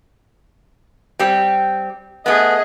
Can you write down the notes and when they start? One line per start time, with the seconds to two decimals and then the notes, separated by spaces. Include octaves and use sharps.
1.19 G3 C4 G4
2.26 A3 B3 G#4 D#5